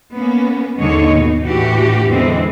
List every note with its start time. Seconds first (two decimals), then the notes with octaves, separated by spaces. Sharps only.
0.14 A#3 B3 C#4
0.77 D#2 G#2 D3 G#3 C#5 D#5
1.12 B2 D#4
1.44 A2 E3 D4 F#4 G4
2.08 E2 D3 E3 F3 G#3 C4